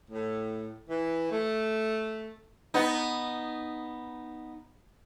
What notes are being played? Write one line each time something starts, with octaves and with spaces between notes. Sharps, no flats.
A2
E3
A3
B3 D#4